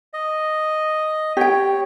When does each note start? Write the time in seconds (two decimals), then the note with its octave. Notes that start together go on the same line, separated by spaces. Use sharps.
0.13 D#5
1.37 G4 C#5 G5